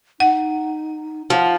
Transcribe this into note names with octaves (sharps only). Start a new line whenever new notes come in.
D#4 F#5
F3 F#5